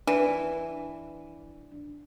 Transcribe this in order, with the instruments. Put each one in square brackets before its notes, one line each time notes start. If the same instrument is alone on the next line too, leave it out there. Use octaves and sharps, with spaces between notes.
[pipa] E3 [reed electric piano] D4